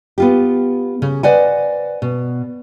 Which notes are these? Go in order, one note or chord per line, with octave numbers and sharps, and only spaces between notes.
B3 F4 G4
C#3
B4 C5 D5 D#5 F#5 G#5
B2